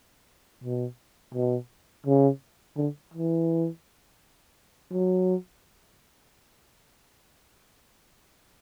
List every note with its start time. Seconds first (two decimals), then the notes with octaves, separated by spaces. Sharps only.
0.64 B2
1.34 B2
2.07 C#3
2.77 D3
3.14 E3
4.92 F#3